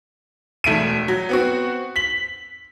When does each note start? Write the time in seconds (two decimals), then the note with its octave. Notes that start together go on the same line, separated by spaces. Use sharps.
0.64 E1 A3 D7 D#7
1.08 F#3
1.29 B3 C4 F#4
1.96 B6 F#7